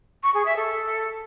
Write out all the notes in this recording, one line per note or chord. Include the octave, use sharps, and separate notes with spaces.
C#6
G#4
E5
A4